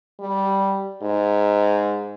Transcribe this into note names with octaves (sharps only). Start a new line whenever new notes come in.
G3
G#2